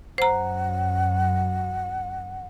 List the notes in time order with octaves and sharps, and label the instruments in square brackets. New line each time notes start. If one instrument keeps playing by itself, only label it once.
[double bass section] F#2 [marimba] C5 A#5 [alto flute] F#5